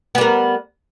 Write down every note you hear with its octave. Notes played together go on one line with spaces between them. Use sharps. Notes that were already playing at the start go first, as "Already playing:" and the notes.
G3 B3 A#4